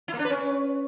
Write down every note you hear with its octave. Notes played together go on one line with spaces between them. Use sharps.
E4
A#3
D4
B4
C#4